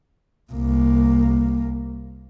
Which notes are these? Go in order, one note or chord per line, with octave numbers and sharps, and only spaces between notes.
C2 A#3